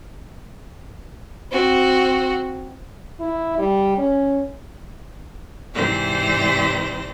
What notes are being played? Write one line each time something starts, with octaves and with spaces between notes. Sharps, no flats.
C4 F#4
E4
G3
C#4
G#2 C3 E3 C5 D5 A#6